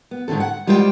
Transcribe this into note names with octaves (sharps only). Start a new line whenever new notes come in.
B3
G#2 D3 D#3 F3 A4
F#5
G3 G#3 F4 C5 D5 G5